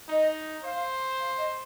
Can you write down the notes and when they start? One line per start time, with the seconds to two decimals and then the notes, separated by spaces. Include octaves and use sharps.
0.08 D#4 D#5
0.64 C5 F5
1.19 F5
1.38 D#5